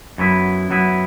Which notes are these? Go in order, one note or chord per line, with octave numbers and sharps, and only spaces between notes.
F#2 F#3 B3 E4
F#2 F#3 B3 E4